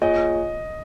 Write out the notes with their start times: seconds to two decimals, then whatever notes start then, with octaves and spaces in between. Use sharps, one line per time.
0.02 A#3 F4 G#4 C#5 D#5 G#5